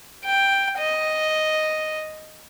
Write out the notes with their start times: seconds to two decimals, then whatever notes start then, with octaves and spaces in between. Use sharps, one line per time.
0.25 G5
0.79 D#5